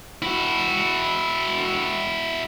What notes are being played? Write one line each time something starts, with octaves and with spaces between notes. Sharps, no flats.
E4 F#4